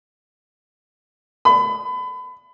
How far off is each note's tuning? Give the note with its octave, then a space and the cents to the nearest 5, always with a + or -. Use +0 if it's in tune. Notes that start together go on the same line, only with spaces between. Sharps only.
B5 +30